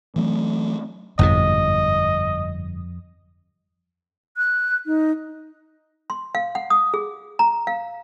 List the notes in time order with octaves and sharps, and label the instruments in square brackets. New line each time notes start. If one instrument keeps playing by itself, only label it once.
[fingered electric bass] E3 F#3 A3 C4
[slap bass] G1 G#2 B2 [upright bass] F2 [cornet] D#5
[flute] F#6
D#4
[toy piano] C6
F5
F#5
D#6
G#4
A#5
F5